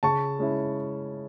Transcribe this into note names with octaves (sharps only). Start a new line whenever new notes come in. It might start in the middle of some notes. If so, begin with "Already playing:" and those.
C#3 A5 C#6
G#3 C#4 E4